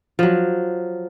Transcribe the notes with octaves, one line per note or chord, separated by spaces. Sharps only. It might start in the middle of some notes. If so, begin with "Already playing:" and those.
F3 F#3